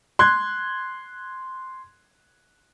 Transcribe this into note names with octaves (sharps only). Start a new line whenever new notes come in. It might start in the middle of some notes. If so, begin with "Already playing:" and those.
C6 F#6 G#6